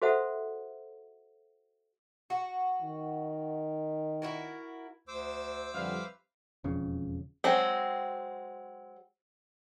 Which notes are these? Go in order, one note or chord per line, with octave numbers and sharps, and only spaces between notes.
F#4 A4 C5 E5 F#5
F#4
D#3
E4 F#4 A#4
D2 C5 D6 E6
F2 D3 G3 B4 E5 F5
E1 F2 C#3
F#3 G#3 C4